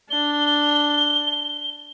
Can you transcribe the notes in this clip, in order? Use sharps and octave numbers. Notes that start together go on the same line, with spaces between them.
D4 G7